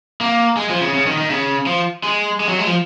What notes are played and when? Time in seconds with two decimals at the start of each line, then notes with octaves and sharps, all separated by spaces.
0.21 A#3
0.57 G#3
0.70 F3
0.81 C#3
0.94 C#3
1.07 D#3
1.18 D#3
1.30 C#3
1.67 F3
2.04 G#3
2.40 G#3
2.49 F#3
2.59 G#3
2.67 F3